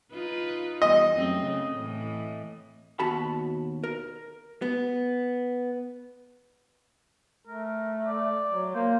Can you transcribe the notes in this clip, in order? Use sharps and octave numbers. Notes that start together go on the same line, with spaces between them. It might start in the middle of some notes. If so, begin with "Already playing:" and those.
D#4 F4 B4
E3 G3 D#5
F#2 A3 C4
C#3
A2 E3
D#2 B2 F#4 A5 B5
A#4
B3
A3 A#4
D5
F#3
A#3 C5